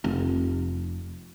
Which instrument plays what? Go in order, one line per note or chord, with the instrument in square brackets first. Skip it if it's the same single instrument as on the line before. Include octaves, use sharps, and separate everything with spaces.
[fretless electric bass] F1